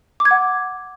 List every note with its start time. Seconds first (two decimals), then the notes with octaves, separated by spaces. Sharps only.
0.20 D6
0.25 G#6
0.31 F#5